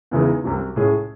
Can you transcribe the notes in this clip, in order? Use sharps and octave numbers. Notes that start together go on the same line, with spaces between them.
E2 C#3 E3 G#3 D#4
C2 C3 F#3
A2 G#3 C#4 G#4